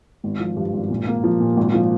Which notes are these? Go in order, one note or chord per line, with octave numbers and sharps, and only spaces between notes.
G#1
F3
G2
G#1
A#2
A#3
F3
A#2
G#1
F3